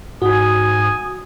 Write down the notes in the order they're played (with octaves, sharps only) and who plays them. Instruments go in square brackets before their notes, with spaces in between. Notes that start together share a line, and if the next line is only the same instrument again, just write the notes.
[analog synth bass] G#2 [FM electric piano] F#4 [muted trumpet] G#5 [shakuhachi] D#6